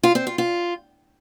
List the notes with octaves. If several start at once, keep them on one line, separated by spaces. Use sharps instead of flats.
F4
C4
F4
F4